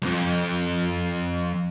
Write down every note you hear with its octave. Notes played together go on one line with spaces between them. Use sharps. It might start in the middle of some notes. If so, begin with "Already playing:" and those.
B1 F2